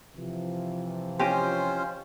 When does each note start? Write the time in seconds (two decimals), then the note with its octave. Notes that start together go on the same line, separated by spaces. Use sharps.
0.15 C3 E3 F3
1.19 C#4 F4 G4 C5 D#5 G#5